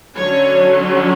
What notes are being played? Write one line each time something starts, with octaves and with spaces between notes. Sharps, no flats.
D3 F#3 C#4 C#5